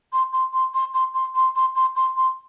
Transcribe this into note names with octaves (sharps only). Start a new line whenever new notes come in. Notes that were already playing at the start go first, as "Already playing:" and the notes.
C6
C6
C6
C6
C6
C6
C6
C6
C6
C6
C6